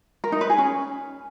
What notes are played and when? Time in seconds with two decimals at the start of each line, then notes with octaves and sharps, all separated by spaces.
0.24 A#4
0.32 D#4
0.41 B4
0.50 G#4
0.58 C#4